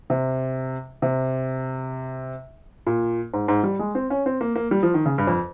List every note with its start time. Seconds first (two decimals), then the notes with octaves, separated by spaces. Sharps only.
0.10 C3
1.02 C3
2.87 A#2
3.34 G#2
3.48 G#2
3.64 G3
3.79 G#3
3.95 C4
4.10 C#4
4.26 C4
4.41 A#3
4.56 A#3
4.71 G3
4.83 F3
4.94 D#3
5.06 C#3
5.18 G2
5.27 F2